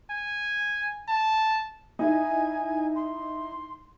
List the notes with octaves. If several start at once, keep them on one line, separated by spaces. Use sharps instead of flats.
G#5
A5
D#4 E4 G#5
C6